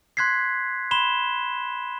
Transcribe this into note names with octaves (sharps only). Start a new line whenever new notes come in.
C6 F#6 G#6 B6 C7
B5 C6 E7 G7